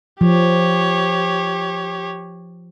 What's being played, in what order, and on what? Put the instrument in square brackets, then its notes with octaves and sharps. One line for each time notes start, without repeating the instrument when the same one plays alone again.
[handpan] F3 [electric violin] G4 C#5